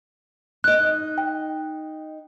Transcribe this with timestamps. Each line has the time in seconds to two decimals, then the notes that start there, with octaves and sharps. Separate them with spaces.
0.64 D#4 D#5 F#6
1.18 G5